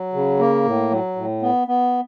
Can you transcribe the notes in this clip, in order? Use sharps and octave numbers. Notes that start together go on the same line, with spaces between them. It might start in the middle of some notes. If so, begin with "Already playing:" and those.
Already playing: F#3
C#3
A#3
A2
F#3
A2
B3
B3